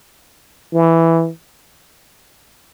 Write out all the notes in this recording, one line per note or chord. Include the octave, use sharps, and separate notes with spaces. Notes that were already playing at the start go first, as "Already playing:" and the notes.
E3